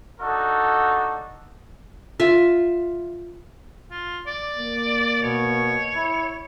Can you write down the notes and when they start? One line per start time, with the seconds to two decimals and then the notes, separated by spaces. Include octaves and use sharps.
0.20 D4 D#4 F#4 A4
2.20 F4 E5
3.90 F4
4.26 D5
4.58 A#3
5.22 B2 C#5
5.95 E4